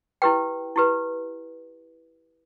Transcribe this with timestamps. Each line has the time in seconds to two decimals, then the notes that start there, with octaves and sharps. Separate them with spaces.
0.22 E4 G4 B4 G5
0.76 E4 G4 B4